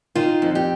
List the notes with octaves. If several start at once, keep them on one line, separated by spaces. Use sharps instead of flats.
D#3 F4
F2
G4